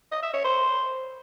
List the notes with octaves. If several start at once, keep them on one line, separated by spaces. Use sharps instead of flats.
D#5
E5
C#5
C5